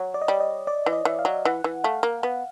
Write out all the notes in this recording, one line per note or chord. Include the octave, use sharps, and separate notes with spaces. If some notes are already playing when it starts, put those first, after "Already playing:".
Already playing: F#3 C#5
D5
D#5
G3 D5
D#5
D5
E3
D#5
E3 E5
F5
F#3
E3 F#5
E3
A3 F5
A#3
B3